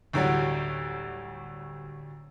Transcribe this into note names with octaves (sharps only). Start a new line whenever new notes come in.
D2 A2 F#3 G3